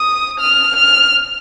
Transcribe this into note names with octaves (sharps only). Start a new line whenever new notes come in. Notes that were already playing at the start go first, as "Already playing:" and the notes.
Already playing: D#6
F6
F6